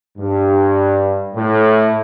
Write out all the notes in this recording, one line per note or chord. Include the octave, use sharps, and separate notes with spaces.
G2
A2